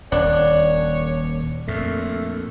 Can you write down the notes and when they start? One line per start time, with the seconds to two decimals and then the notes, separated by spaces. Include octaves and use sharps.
0.12 D#1 D4 C#5
1.68 F2 A#2 A3